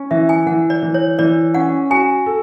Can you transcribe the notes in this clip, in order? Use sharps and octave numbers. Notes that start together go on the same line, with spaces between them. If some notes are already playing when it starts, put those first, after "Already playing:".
Already playing: C#4
E3 E5
G#5
E3 F#5
D5
E3
C#5
E3 D5
C#4 F#5
F#4 G#5
A4